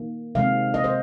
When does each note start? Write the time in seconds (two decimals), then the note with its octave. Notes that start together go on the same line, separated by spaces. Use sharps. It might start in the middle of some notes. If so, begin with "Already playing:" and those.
Already playing: D#3 A#3
0.35 C3 D#3 G#3 C4 F5
0.74 D#5
0.84 C5